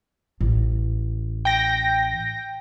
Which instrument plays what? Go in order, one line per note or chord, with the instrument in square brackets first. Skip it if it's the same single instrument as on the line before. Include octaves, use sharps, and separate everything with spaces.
[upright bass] A1
[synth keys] G5 A#6